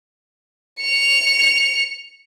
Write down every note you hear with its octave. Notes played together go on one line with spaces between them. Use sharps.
C#7 F7